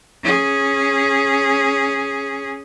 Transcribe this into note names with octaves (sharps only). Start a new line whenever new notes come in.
C#4 G#4